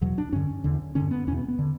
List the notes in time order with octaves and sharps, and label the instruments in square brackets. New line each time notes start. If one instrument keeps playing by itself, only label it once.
[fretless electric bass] E2 B2 F#3
D4
G2 D3 C#4
E2 D3
G2 D3 C#4
B3
E2 B2 C#4
B3
B3
D3